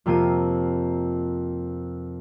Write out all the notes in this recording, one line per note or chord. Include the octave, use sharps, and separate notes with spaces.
F2 C3 A#3 F4 D#7